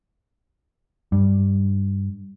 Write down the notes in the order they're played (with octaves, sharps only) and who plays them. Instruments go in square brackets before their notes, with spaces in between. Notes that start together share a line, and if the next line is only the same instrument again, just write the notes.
[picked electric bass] G2